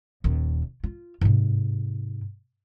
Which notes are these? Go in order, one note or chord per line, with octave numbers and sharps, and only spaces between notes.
D#1 D#2
F4
G#2 C3